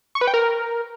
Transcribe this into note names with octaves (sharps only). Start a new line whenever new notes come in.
C#6
B4
G5
A#4